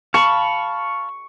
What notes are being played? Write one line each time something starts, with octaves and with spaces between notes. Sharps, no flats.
F5 A5 B5 C#6